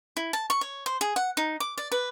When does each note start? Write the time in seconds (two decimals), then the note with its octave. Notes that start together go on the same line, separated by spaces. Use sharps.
0.17 E4
0.33 A5
0.50 C#6
0.61 C#5
0.86 C5
1.01 G#4
1.16 F#5
1.37 D#4
1.60 D6
1.78 D5
1.92 B4